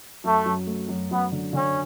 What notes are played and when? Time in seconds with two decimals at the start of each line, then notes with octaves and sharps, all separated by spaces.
0.24 F#2 A3
0.46 F#2
0.67 A3
0.89 F#2
1.10 F#2 B3
1.32 D3
1.53 D3 C#4